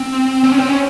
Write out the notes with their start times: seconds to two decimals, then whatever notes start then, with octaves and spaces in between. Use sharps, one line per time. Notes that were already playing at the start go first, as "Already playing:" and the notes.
Already playing: C4
0.44 C4
0.52 C#4
0.60 C4
0.69 C#4